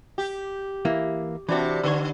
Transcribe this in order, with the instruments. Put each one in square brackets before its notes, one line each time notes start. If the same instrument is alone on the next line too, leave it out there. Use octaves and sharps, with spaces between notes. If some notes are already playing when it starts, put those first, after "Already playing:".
[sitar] G4
[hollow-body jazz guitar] E3 A#3 E4
[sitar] C3 D4 [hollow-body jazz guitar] E3 F#4
[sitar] D3 [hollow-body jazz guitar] D4 B4 C#5